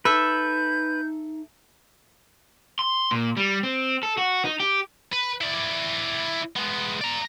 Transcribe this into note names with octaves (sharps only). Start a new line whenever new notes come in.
D#4 A4 B4 E5 G6
C6
A#2
G3
C4
A4
F#4
D#4
G4
B4
E4 D5
G#3 B3
D5 A#5